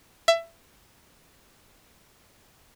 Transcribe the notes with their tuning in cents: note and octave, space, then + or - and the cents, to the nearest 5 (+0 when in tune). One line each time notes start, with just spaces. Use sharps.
E5 +20